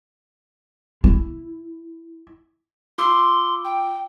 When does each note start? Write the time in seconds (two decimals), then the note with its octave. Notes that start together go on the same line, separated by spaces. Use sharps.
1.04 E4
2.98 F4 C6 D6 E6
3.65 G5